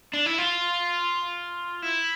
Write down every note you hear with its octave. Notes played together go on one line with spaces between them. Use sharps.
D4
E4
F4
E4